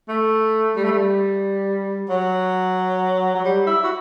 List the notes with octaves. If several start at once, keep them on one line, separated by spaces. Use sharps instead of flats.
A3
G3
A3
G3
F#3
F#3
G3
E4
F#4